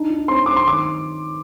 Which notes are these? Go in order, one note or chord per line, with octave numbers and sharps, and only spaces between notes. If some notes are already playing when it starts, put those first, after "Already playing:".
Already playing: D4 D#4
D#4
C4 C6
C4 D6
C6
D#3 D6